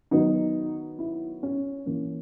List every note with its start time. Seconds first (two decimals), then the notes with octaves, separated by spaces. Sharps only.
0.11 D#3 F#3 B3 D#4
0.99 E4
1.43 C#4
1.86 E3 A#3 C#4